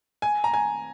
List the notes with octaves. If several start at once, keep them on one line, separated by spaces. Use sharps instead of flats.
G#5
A#5
G#5